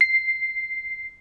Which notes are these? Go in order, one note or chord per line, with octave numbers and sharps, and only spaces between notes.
C7